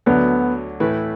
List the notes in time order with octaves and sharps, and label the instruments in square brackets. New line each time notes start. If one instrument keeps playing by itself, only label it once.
[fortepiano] D2 D3 F#3 [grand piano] B3
[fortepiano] A2 E3 A3 E4 B4